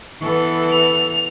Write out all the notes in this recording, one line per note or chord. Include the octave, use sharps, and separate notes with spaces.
E3 B3 A4
F7